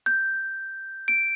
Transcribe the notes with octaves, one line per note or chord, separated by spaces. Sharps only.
G6
D7